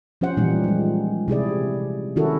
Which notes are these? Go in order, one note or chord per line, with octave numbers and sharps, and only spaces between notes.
F3 C#4 C5 F#5
A#2 E3 F3 G3 D#4
F3 G#3
C3 E4 G#4 D5
D#3 C#4 E4 F#4 A4 A#4